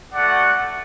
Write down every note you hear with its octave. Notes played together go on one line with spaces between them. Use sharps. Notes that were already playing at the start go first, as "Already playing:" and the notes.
A3 F#4 D5 F#5